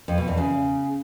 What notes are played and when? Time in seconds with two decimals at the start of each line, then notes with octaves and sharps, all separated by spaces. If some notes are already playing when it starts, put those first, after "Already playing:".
0.08 F2
0.18 B2
0.28 E2
0.37 C#3